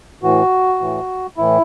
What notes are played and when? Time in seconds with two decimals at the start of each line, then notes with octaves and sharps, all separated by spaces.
0.22 A2 E3 F#4
0.80 A2 E3
1.37 A2 E3 E4